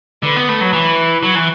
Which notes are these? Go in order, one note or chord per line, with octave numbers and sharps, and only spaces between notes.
D3 B4
B3
A3
F#3
E3
F#3
E3